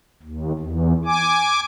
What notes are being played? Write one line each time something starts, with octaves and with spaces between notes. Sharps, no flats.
D#2
E2
G#5 D6